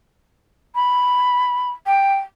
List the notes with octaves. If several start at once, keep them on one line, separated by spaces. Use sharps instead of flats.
B5
G5